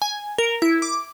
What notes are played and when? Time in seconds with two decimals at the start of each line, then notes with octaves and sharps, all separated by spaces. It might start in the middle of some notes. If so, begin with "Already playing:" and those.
0.02 G#5
0.38 A#4
0.62 E4
0.82 D6